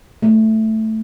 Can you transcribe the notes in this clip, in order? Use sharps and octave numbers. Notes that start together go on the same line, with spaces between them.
A3